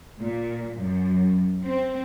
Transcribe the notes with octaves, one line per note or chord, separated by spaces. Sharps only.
A#2
F#2
C4